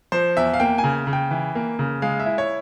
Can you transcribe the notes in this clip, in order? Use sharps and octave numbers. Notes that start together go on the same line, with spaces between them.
F3 C5
E2 E5
F5
A#3 G5
G#5
C#3
C#3
G5
E3
A#3
C#3
G#3 F5
E5
E4
C#5